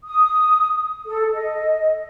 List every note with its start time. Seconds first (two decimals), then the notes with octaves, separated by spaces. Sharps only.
0.05 D#6
1.06 A4
1.33 D#5